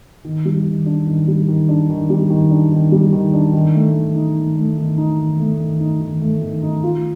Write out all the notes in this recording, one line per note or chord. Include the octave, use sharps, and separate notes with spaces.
D#3
G3
D#3
D4
D#3
G3
D#3
D4
D#3
G3
D#3
D4
D#3
G3
D#3
D4
D#3
A3
D#3
D#4
D#3
A3
D#3
D#4
D#3
A3
D#3
D#4
D#3
A3
D#3
D#4
F4